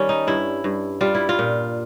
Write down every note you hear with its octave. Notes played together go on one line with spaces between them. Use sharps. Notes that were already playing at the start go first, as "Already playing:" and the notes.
Already playing: D#3 G3 C#4
D#4
G2 E4
G2
G3 F4
E4
F4
A#2